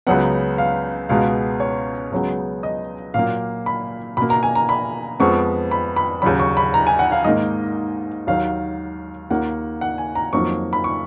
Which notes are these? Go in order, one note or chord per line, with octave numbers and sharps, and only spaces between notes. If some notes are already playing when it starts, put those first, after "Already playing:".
C#2 C#3 F#3 B3 F#5
F5
C#2 B2 G#3 B3 F5
C#5
C#2 C#3 F#3 B3
D#5
A#2 F#3 A#3 F5
B5
B2 A#3 B5
A#5
G#5
A#5
B5
F2 F3 G#3 B3 C#6
B5
B5
D#2 C#3 F#3 B5
C#6
B5
A#5
G#5
F#5
F5
G#2 D#3 A#3 D#5
D#2 D#3 F#3 F5
D#2 D#3 A#3 F#5
F#5
G#5
A#5
F2 D#3 F#3 A#3 C#6
B5
C#6